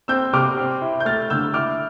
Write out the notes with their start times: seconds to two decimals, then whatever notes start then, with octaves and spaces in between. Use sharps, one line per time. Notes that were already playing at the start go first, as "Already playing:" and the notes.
0.08 C4 E6 G6
0.33 C3 D6 F6
0.57 C4
0.82 E4
1.00 G6
1.05 A3 F6 A6
1.30 D3 E6 G6
1.54 E4 D6 F6